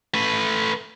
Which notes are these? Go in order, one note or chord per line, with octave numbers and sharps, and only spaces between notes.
A3 B4